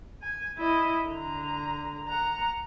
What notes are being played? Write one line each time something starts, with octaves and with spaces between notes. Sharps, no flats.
G#5
E4 D#5
D3 A#5
F#5 A#5